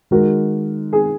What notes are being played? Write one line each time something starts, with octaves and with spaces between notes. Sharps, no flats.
D#3 G#3 F#4 A#4
G#4